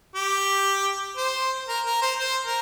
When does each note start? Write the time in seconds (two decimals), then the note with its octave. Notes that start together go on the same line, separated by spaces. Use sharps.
0.15 G4
1.16 C5
1.68 A#4
1.85 A#4
2.02 C5
2.19 C5
2.45 A#4